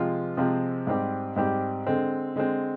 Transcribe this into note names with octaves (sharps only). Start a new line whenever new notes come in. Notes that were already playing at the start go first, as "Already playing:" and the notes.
Already playing: C3 F3 G#3 C4 F4
C3 F3 G#3 C4 F4
G#2 G3 C4 G4
G#2 G3 C4 G4
D3 G#3 C4
D3 G#3 C4